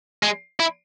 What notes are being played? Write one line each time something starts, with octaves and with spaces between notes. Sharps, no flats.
G#3
E4